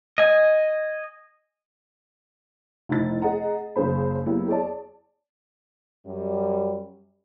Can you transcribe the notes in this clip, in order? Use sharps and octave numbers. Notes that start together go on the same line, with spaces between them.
D#5 G#5
F1 D#4 E4 A6
G#4 D#5 F#5 A#5
F#1 C#3 F#3 G#4 C5 B5
F#3 A#3 B3 E4 G4
G#4 C#5 D5 A5
F#2 G3